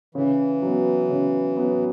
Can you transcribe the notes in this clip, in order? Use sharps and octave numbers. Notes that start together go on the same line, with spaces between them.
C#3 E3
F#3
B3
C#3
F#3 B3